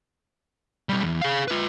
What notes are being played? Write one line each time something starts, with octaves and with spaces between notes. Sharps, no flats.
B1 G3
E2
G#4 F5
F4 B4